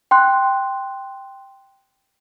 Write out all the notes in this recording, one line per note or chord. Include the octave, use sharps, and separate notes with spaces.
G5 C6 F#6